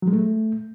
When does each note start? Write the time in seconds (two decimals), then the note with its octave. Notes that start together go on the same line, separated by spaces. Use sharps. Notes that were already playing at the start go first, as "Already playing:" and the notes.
0.02 F#3
0.08 G#3
0.13 A3